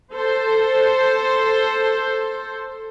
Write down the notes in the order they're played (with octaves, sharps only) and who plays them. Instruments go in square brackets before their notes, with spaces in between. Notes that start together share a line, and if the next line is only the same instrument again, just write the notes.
[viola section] A4 C5